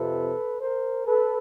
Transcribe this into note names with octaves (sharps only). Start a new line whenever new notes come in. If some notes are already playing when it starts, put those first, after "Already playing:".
Already playing: F2 C3 F3 A4 B4
A#4 C5
A4 B4